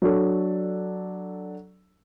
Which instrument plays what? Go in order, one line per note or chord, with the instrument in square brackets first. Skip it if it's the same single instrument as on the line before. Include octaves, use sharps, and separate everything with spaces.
[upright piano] F#3 D4 A4